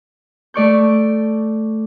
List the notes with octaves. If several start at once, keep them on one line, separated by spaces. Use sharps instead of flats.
A3 D5 C#6 G6